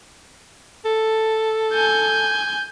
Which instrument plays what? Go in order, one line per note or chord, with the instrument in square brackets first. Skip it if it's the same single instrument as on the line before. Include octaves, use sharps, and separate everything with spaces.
[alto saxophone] A4
[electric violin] G#5 G6